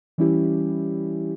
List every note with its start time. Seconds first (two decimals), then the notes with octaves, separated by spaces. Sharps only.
0.18 E3 G3 C#4 E4 G4